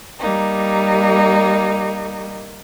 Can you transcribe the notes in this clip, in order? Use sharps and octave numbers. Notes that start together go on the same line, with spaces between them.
G3 A#3 D#4